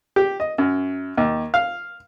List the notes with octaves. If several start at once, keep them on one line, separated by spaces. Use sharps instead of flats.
G4
D#5
F#2
D#2
F5